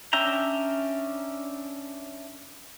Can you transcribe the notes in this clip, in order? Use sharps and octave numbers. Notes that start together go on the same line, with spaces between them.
C#4 D4 E5 G5 A#5